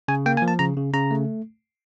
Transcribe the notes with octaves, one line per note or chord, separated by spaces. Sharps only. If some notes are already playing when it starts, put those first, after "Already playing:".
C#3 G#5
A#3 G5
G#5
F3
A5
C#3 A#5
C#3
C#3 A#5
A3